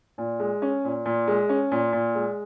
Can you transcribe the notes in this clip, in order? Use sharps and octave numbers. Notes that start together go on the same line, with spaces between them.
A#2
G#3
C#4
A#2
A#2
G#3
C#4
A#2
A#2
G#3